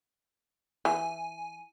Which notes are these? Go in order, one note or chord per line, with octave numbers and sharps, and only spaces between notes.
E3 G#5